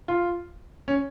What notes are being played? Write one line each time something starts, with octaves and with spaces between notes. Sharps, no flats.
F4
C#4